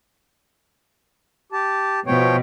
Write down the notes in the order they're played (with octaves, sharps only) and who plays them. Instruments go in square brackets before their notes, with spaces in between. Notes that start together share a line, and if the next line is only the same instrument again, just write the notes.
[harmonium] G4 A5
[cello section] B2 [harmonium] F3 C#5 G5